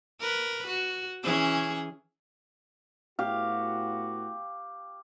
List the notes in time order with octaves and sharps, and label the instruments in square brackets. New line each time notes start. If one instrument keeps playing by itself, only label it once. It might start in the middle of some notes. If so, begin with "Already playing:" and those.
[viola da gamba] A#4 B4
F#4
E3 C#4 G#4
[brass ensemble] A2 B3 F#4 [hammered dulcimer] G4 F5